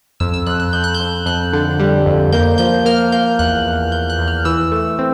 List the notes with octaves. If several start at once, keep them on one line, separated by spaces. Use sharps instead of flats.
F2 E6
E6
F2 F#6
F#6
F2 G6
F#6
G6
F2
F2 F#6
D3
G3
F2
A#3 G6
F3 G6
A#3 F6
A#3 G6
E2 F#6
E2
E2 G6
F#6
E2
F6
E3 E6
A3
C4